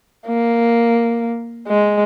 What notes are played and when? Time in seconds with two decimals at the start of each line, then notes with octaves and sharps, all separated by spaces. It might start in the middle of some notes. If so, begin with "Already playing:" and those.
0.27 A#3
1.68 G#3